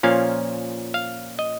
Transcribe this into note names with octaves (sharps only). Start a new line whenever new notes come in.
A#2 F3 A#3 C#4 F5
F5
D#5